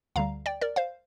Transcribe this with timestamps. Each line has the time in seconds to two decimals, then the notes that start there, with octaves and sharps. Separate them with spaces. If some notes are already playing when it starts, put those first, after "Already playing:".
0.16 D2 D3 G3 F5 A#5
0.46 D5 G5
0.61 A#4 D5
0.76 C5 F5